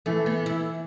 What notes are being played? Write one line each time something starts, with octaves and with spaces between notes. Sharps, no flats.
E3 A3
B3
E4